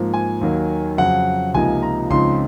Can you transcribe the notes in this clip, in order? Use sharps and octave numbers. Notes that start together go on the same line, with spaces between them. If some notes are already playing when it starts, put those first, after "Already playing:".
Already playing: G#2 F3 A#3
G#5
D#2 D#3 F#3 A#3
F2 C#3 F#3 F#5
C#2 C3 F3 A#3 D#4 G#5
A#5
C#2 C#3 F3 C4 D#4 C6